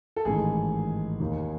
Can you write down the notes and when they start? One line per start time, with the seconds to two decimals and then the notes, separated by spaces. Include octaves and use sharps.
0.16 A4
0.25 A1 G#2 D#3 G#4
1.20 D#2 D#3